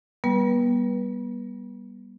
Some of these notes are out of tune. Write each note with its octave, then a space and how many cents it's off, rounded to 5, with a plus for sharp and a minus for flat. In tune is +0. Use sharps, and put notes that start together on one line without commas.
G3 +0 B3 -35 B4 -25